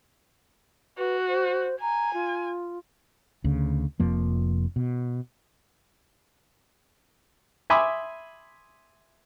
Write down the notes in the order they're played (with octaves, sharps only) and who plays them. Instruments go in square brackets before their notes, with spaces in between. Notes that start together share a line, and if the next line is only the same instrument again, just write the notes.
[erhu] F#4 [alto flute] B4
[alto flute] C5
[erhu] G#5 [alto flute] A#5
[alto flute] F4
[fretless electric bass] D2 C#3
F1 F2 F3 A#3
B2
[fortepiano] E5 G#5 B5 C6 D6 D#6